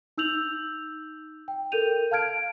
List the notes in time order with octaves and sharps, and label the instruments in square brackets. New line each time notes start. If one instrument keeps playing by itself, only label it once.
[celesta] D#4 E6 G6 F7 F#7
G5
A4 A#4 G6 D#7 F7
F5 A5 F6 G#6 D7